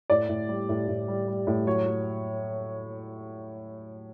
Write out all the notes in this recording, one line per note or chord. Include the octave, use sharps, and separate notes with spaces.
A2 D5
A2
G3
A2
A2
G3
G3
A2
F#3 C#5
F#3